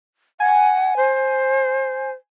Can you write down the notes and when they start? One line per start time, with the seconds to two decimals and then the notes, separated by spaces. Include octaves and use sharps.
0.40 F#5 G#5
0.97 C5